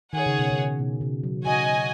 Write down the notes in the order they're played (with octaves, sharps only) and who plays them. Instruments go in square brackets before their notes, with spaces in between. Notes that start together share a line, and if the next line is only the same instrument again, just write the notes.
[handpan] D#3 [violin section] G#4 C#5 F#5
[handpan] C#3
B2
C#3
B2
C#3
F#3
[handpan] C#3 [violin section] F#4 D#5 G#5